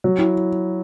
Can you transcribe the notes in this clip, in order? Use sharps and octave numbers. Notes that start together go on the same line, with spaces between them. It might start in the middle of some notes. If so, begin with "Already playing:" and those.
F#3
E4